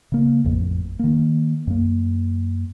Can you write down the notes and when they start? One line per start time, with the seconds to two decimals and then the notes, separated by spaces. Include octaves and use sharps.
0.12 C#3 A#3
0.44 A1 F2
0.99 D#3 A#3
1.67 F#2 A#3